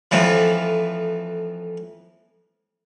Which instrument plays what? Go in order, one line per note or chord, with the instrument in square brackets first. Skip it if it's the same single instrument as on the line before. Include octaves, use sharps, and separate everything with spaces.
[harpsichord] F2 A2 E3 F3